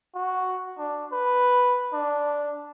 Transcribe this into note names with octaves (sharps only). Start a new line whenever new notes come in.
F#4
D4
B4
D4